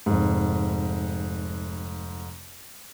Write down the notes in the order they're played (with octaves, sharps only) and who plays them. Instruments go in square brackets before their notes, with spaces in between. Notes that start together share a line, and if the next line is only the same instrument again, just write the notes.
[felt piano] F1 G#2